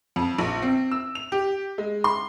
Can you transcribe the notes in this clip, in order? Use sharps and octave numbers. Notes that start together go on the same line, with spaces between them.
F2
A#1
C4
E6
F7
G4
G#3
C6